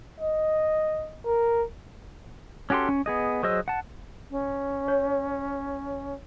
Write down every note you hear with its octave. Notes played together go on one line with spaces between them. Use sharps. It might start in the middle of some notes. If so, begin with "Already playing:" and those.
D#5
A#4
C#4 F#4 G4 A4 C6
C#4
B3 G#4 D#5
F#3 G#4 C5 D#5 E6
F#5 A5
C#4
C#5